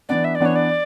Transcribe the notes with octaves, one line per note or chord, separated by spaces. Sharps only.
E3 B3 D4 D5
E5
D5
E3 B3 D4 C#5
D5